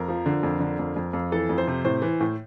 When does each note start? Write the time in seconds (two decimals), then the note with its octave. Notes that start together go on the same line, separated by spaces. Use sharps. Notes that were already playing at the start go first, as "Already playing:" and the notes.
Already playing: F2 A#4
0.08 F3
0.26 D3
0.43 F2
0.60 D3
0.79 F2
0.96 F2
1.13 F2
1.32 E3 A4
1.49 F2
1.58 C5
1.67 C3
1.84 A2 C5
2.02 E3
2.20 A2